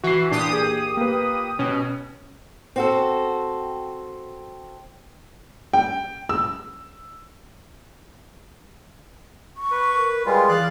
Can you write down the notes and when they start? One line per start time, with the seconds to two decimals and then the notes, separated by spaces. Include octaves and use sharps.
0.04 E3 F#4 C7
0.31 A#2 D4 G4 D#6
0.53 G#4
0.97 A#3 B4
1.59 B2 C#4
2.76 C4 F#4 A4
5.73 G5
6.29 E6
9.57 C#6
9.71 B4
9.96 A#4
10.26 G3 G#3 F4 G#4 B4
10.49 E3 D5 F5 F#6